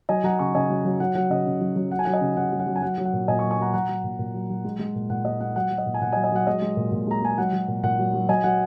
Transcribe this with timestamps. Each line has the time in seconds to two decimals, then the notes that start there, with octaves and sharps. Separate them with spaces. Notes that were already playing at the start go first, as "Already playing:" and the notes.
0.09 F#3 D#5 G#5
0.24 F#3 F#5 A#5
0.39 C#3 G#5 C#6
0.55 C#3 D#5 G#5
0.70 F#3
0.85 F#3
1.00 F#3 F#5
1.15 F#3 F#5
1.30 C#3 D#5
1.46 C#3
1.61 F#3
1.76 F#3
1.91 F#3 F#5
1.99 G#5
2.05 F#3 F#5
2.13 D#5 G#5
2.21 C#3
2.37 C#3 F#5
2.52 F#3
2.59 F#5
2.67 F#3
2.76 G#5
2.82 F#3 F#5
2.98 F#3
3.05 F#5
3.13 A#2
3.28 A#2 D#5 G#5
3.39 G#5 C#6
3.43 F#3
3.51 G#5 C#6
3.58 F#3 F#5 A#5
3.73 F#3 F#5 A#5
3.89 F#3
4.04 A#2
4.19 A#2
4.34 F#3
4.50 F#3
4.64 G#3
4.79 G#3
4.95 A#2
5.10 A#2 F#5
5.25 G#3 D#5
5.40 G#3 F#5
5.56 F#3 F#5
5.71 F#3
5.78 D#5
5.86 A#2
5.94 G#5
6.01 A#2 F#5
6.12 D#5 G#5
6.16 F#3
6.24 D#5 G#5
6.32 F#3 F#5
6.47 G#3 D#5
6.62 G#3
6.77 A#2
6.92 A#2
7.07 G#3 A#5
7.22 G#3 G#5
7.38 F#3 F#5
7.53 F#3
7.68 A#2
7.83 A#2 F#5
7.99 F#3
8.14 F#3
8.29 F#3 D#5 G#5
8.44 F#3 F#5